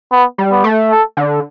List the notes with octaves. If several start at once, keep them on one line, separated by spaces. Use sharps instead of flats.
B3
G3
B3
A3
A4
D3